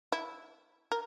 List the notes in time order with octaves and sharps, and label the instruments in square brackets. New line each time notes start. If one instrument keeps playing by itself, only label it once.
[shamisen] E4
A#4